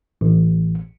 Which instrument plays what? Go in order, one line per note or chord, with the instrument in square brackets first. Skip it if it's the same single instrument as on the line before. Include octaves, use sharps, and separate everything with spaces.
[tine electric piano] A1